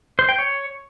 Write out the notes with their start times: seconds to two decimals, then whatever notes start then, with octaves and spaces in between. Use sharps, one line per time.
0.19 C5
0.29 G5
0.38 C#5